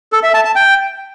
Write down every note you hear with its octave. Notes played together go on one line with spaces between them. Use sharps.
A4
E5
A5
A5
G5